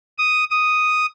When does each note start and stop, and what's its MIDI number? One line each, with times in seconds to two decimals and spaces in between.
0.18 0.44 87
0.51 1.06 87